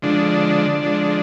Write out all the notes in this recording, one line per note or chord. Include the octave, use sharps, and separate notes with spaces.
D3 F3 G#3 D4
D3 F3 G#3